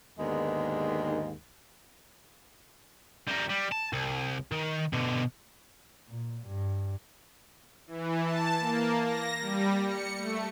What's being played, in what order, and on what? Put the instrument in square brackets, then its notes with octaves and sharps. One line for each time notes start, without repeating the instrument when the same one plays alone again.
[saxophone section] D#2 G#2 D3 D#3 G#3 B3
[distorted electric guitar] G3 A#4
G3
A5
C2
D#3
B2 D3
[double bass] A#2
G2
[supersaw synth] E3
A5
A#3
A#6
G3
C#7
A3